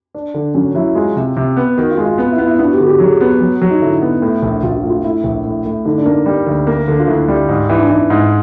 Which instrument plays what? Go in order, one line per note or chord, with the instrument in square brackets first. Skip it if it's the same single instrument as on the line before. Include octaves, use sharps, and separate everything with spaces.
[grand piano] D4
D3
[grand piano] F#3 [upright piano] C#4
[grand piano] F#3 [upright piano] E4
[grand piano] G#3 [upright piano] F4
[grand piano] C3
C3
B3
[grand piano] D#3 [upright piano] F#4
[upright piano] F4
[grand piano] G#3
[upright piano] F4
[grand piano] B3
[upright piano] E4
[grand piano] B3
[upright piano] E4
[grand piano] B3 [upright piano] D4
[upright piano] F#4
G4
[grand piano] D3
[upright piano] G4
[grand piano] F#3 [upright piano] G#4
[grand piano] B3
F#3
F#3
[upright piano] D#4
[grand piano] D3 [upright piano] E4
[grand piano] B3
A2
A#1
[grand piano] A#1 [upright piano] F4
[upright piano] F4
[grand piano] A2
[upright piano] F4
[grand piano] A2 [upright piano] E4
[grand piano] A#1
A2
A2
[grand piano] D3 [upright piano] D#4
[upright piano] D4
[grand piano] A#3
[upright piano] D#4
[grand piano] G3
D2
A#3
D3
[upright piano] F4
[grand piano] D2 [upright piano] E4
[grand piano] G3
G#2
E3
[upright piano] D4
[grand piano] E3 [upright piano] D#4
[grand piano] G#2